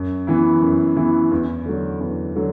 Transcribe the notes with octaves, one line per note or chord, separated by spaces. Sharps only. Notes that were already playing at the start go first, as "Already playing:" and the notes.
Already playing: F#2
E3 B3 E4
F#2
E3 B3 E4
E2
D3 F#3
E2
D3 F#3